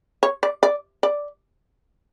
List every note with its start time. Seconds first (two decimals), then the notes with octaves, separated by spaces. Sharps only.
0.23 C#5
0.43 D5
0.63 D5
1.03 D5